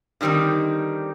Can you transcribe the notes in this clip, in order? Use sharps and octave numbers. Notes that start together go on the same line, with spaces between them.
D3 D#3 G3 C4 D#4